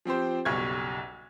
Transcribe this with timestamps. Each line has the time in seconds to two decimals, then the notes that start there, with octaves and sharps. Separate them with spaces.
0.05 F3 C4 G4 C5
0.45 F#1 B1 G3 C#6 G#6